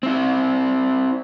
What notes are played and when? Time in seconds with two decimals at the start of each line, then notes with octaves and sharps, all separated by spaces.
0.03 C4 E4